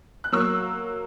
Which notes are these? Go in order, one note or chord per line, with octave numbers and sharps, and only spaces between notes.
F#6
F#3 A#3 C#6 E6